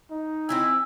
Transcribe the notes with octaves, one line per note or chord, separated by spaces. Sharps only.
D#4
C4 E4 G#5 E6